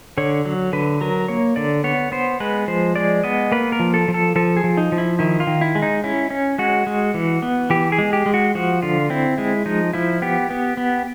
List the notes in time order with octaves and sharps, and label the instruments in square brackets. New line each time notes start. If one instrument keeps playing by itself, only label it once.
[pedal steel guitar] D3 C#5
F#3
D3 B4
F#3 A#4
A#3 C#5
D3 D5
B3 C#5
B3 C5
G#3 B4
F3 C5
G#3 D5
B3 D#5
A#3 B4
A#4
F3
A4
F3
A4
F3 A4
G#4
F3
D#4
F3
E4
D#3 E4
F4
D#3
E4
G#3
D#4
C#4 E4
C#4
G#3 F#4
G#3
E3
B3
E3 G4
G#4
G#3
G4
G#3
F#4
F3 F#4
D3 F4
C4 E4
G#3 E4
F3 D#4
F3 E4
B3 G4
B3
B3